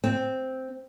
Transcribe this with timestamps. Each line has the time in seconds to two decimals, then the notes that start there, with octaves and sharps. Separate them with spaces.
0.04 C4